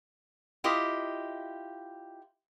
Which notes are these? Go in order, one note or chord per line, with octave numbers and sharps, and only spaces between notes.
E4 F4 G4 D#5